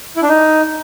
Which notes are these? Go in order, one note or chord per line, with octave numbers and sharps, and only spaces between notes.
E4
D4
D#4